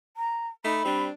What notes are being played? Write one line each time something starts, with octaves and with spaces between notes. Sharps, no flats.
A#5
A3 D#4 B5
G3 C4 D4